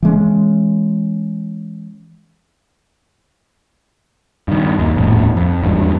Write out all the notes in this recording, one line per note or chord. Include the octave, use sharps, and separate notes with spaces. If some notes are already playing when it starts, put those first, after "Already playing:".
E3 G#3 C#4
G2 D#3
D#2
D#1 F2 A2
F2
G#1 E2 G2